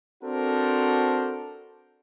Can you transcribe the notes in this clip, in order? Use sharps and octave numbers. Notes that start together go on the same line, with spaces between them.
C4 D4 F#4 A4 A#4 C5